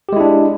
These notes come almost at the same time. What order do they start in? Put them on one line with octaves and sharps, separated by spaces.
G4 G#3 E4 D4